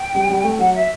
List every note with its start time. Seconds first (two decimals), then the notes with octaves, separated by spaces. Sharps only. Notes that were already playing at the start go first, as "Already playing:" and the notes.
Already playing: G5
0.15 G3
0.29 G3
0.44 A3
0.59 F#3 F#5
0.74 E5